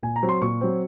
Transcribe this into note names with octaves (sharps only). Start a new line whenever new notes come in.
A#2 G#5
A#5
F#3 C4
C6
A#2 C#6
F#3 C4